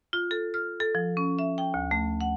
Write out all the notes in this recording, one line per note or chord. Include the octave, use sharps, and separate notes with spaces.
F4
A4
F6
A4
F3
C#4
E5
G5
D2
A3
F#5